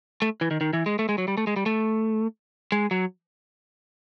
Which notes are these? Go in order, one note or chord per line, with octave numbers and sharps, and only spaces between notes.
A3
E3
D#3
D#3
E3
G#3
A3
G#3
F#3
G3
A3
G#3
G3
A3
G#3
F#3